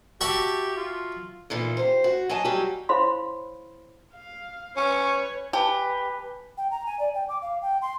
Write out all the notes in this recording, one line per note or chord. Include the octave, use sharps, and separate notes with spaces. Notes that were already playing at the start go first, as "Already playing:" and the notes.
F#4 G4 E5 A5
F4
E2 A#2 D#3
G4 C5
F#4
F#3 D#5 G#5 A5
F#3 G3 F#4 G4
E4 C5 C#5 F5 B5 C6
F5
C#4 B4 C#5
G4 B4 G#5 A5
G5
A#5
G#5
D5
G5
D6
F5
G5
C6